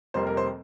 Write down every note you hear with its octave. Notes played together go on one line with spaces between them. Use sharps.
F1 F2 C3 G3 A#3 C5
A#4
C5